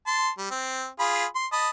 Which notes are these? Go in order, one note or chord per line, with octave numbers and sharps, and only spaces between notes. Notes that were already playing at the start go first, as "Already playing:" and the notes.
A5 C6
G3
C4
F4 G#4 B5
C6
D#5 A5 B5